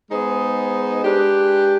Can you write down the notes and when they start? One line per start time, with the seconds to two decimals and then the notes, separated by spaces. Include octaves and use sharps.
0.11 G#3 B3 D#4 G#4 C5
1.02 G#3 D4 G4 B4